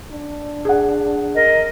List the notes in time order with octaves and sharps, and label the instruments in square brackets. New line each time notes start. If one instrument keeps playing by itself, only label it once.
[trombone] D4
[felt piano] G#4 F#5
[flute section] A#4 D#5